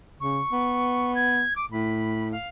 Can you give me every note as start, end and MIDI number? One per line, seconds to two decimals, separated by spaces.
0.20 0.41 49
0.20 1.12 85
0.52 1.44 59
1.15 1.54 92
1.56 1.66 86
1.72 2.35 45
1.72 2.31 83
2.32 2.48 77